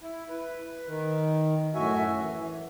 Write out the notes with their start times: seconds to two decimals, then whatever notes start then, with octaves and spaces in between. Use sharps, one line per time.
0.01 E4
0.29 B4
0.88 D#3
1.75 F#2 A2 F#4 E5 G#5
2.20 E3